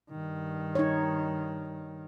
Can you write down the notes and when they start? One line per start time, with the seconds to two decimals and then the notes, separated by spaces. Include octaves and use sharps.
0.10 G2 D#3
0.75 D#4 C#5